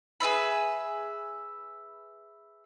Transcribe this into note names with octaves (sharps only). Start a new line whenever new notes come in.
G#4 B4 E5 B5